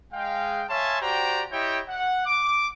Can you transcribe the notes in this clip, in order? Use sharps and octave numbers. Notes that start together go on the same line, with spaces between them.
G#3 F5 G5
C#5 E5 F5 G#5 A5 C6
F#4 G4 C5 D5 G5 A#5
E4 G4 C#5 D#5 G5
F#5
D6